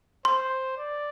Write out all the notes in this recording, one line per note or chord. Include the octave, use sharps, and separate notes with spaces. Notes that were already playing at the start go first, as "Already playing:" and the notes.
C5 C6
D5